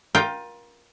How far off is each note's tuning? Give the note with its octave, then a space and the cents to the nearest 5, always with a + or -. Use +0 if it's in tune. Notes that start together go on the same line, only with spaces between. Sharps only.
F4 +20 A#4 +30 G5 +0